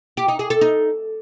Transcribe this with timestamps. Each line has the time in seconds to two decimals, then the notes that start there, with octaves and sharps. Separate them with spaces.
0.17 G4
0.28 D#4
0.39 G#4
0.50 A4
0.61 D#4